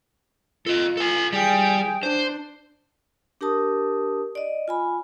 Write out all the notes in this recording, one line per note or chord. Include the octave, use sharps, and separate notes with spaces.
F4 A4 D#5
A4 G#5
G3 G#4 G5
D4 C5
D4 G4 A#4 A5 D#6
D5 D#5
F4 G#5 B5